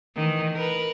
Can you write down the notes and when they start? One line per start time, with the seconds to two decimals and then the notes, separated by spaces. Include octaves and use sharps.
0.16 D#3 E3
0.53 A#4 B4